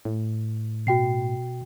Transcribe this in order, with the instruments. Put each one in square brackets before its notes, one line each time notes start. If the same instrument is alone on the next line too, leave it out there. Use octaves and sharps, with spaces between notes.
[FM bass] A2
[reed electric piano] B2 [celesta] F#4 G5 C7